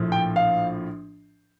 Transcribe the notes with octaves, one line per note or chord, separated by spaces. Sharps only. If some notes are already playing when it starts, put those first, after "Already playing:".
Already playing: A#1 A2 F3
G5
F5